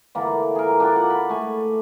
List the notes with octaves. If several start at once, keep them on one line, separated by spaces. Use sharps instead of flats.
D3 E3 A#3
G#4 A#4
D4 F4 D5 G5
F#5
B5
A3 G#5